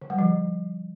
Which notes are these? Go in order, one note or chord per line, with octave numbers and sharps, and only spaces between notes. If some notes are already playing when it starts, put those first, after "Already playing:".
D3
G3
F3